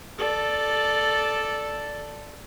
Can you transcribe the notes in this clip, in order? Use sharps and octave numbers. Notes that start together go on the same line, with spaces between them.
A4 D5